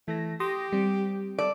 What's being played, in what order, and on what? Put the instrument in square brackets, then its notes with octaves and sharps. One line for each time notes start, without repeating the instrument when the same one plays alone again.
[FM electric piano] E3 A#6 [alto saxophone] A3
[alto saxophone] G4 [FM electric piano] C6 D#6 A#6
[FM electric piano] G3 C4
[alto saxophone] A4 [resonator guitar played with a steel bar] D5